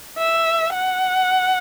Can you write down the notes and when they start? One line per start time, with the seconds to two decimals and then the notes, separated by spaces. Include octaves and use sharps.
0.18 E5
0.74 F#5